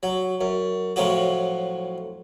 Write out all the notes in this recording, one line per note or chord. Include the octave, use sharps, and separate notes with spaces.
F#3
F#2
A2 F3 F#3 F#4